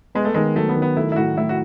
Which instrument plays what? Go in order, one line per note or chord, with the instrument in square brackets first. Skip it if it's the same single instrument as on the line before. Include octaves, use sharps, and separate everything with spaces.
[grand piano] G#3 [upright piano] B3
[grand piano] A3
[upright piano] D#3 [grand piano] G#3
[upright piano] F#3 [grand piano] A3
[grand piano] B3
[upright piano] D#3
[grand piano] B3
[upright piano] A3 [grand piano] E4
[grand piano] E4
[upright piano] A2 [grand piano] F#4
[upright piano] A2 [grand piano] E4
[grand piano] F#4